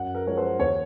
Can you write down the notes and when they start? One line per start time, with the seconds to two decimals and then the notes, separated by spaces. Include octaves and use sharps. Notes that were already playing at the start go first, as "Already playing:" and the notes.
Already playing: F#2 F#5
0.15 A#4
0.27 F3 G#3 C#5
0.37 C5
0.60 D#2 C#5